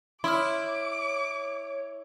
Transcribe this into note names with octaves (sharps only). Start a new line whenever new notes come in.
E4 C#5 C6 D6 D#6 F6